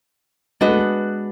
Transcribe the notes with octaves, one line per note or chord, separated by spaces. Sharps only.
G#3 B3 D4 F#4 B4 D#5
A3
G#3